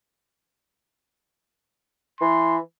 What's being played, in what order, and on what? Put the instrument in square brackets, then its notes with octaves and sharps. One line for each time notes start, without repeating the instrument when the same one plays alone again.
[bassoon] E3 [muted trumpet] C6